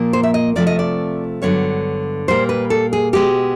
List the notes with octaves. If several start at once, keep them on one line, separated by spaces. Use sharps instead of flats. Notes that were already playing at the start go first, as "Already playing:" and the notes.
Already playing: A#2 F3 A#3
C5
E5
D#5
C3 F3 A3 C4 D5
D#5
D5
G2 D3 F#3 B3 C#5
A#2 G3 A#3 C5
B4
A4
G#4
B2 G#3 B3 G4